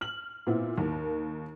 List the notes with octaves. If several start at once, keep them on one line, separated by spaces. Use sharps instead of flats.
F6 F#7
A#2 B3 C4 E4
D#2 A#4